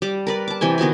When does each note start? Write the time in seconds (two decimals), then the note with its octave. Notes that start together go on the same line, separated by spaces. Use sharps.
0.02 G3 D6
0.27 A#4 B4 D5
0.48 A5 D6
0.61 C3 E3 G5 G#5
0.78 D#3 B3 F#4 G#5